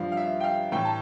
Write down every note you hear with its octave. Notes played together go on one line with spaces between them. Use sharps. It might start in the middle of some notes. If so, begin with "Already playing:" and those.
Already playing: G2 F3 F5
F5
E5
G5
F5
A2 E3 G5
A5